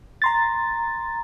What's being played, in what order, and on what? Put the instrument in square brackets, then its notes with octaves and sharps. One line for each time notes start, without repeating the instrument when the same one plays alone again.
[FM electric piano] A#5 C6 A6